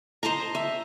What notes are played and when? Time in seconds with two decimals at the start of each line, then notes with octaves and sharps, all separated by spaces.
0.23 C5 D#5 A5 A#5
0.55 E5